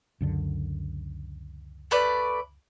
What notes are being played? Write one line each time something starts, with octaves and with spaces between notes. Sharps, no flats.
C#2 F#2 D3
A3 B4 D5